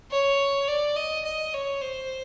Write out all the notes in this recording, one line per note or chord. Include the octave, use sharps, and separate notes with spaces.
C#5
D5
D#5
D#5
C#5
C5